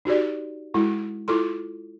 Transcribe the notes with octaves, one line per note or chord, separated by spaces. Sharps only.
D#4 F#4 G4 D5
G#3 E4 F#4 A4
E4 F4 A4 C6